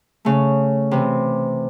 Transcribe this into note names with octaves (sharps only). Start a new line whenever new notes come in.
C#3 A3
C3 E3